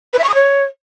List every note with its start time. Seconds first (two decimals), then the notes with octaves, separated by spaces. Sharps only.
0.13 B4
0.18 E5
0.23 C#6
0.29 D#6
0.34 C#5